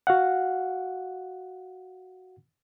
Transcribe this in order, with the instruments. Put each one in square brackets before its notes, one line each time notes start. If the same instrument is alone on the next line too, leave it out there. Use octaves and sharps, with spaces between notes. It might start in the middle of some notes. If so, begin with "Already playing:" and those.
[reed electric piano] F#4 F5 F#5